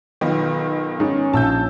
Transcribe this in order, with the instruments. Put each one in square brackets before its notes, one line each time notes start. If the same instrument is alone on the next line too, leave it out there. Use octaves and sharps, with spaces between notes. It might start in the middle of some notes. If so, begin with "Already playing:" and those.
[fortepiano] B1 [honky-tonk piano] D#3 B3 F4
[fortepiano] G#2 [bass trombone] C#4
[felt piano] A#1 [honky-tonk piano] A5 E6 G6